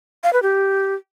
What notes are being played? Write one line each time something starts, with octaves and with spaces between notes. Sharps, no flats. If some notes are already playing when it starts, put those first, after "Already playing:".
F5
B4
G4